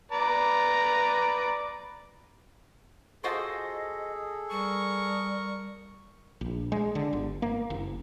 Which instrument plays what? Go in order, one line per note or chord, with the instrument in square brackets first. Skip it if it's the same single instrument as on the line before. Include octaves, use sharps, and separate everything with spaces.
[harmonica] B4 D5 A#5
[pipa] F4 F#4 C5 [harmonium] G#4 A4 [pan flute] D#5
[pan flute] G3 [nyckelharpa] A#4 C#6
[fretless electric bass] A#1
G#3
D3
G1
A#3
F#1